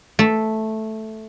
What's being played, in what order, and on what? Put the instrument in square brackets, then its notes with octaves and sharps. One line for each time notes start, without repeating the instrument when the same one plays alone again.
[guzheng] A3